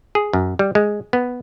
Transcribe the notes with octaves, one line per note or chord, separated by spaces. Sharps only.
G#4
F#2
G3
G#3
B3